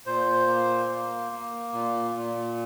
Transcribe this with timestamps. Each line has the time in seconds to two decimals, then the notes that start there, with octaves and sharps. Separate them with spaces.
0.06 A#2 C5
0.47 A#3
0.89 A#3
1.32 A#3
1.73 A#2
2.16 A#2